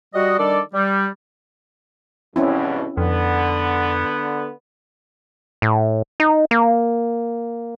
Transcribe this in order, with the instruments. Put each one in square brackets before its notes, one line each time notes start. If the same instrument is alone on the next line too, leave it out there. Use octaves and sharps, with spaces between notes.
[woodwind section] G3 F#4 D#5
D#3 G3 D4 A4 D5
G3
[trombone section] E2 G2 B2 [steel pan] C4 C#4 E4
[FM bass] F2 [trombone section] D3 B3
[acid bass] A2
D#4
A#3